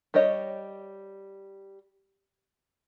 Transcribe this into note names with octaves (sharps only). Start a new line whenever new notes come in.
G3 G4 C#5 D#5